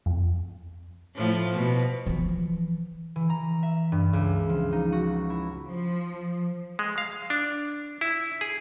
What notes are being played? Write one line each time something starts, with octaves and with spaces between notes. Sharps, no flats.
F2
A2 F3
B2
E3 F3
E3
A#5
E5
G2
C#2
F3
D#4
F#4
E4
F3
G#3
F5
D4
E4
G#4